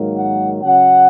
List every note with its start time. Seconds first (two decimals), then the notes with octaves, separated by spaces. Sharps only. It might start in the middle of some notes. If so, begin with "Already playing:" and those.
Already playing: G#2 D#3 F#3 A#3
0.15 F#5
0.63 C#3 F#3 C#4 F#5